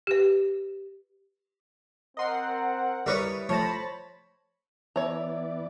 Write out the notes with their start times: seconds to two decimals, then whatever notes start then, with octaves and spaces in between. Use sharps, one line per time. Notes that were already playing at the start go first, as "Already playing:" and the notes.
0.07 G4 B4
2.17 C4 A#4 D#5 F#5 C6 C7
3.06 G3 E4 A#4 B4 C#5 C#6 D#6
3.49 F3 A3 C5 C#5 A5 B5 A#6
4.96 E3 B3 C#5 D5 E5 A#5